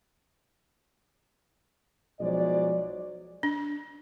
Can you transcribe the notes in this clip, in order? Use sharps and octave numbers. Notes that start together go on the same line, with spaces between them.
B1 F3 F#3 G#3 D5
D4